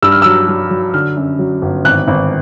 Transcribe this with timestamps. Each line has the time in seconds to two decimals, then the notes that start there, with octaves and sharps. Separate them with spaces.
0.02 G2 E6
0.12 F6
0.22 F#3 E6
0.48 F#3
0.71 F#3
0.94 D3 F6
1.16 F#2
1.39 F#3
1.62 G1
1.85 G#1 F#6
2.08 G#1